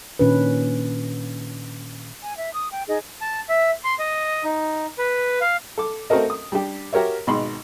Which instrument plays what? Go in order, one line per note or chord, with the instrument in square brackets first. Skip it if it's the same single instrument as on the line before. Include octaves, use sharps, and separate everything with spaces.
[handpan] A#2 D#3 C#4 D4 B4
[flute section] G#5
E5
D#6
G5
D#4 G#4 D#5
[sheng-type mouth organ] A5
E5
C6
D#5
D#4
B4
F5
[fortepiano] A4 D6
A3 C4 F#4 A4 A#4 D#5
D#6
G3 D4 G4
F#4 G4 A#4 C#5 E5
G#1 B2 D#4 B5 C6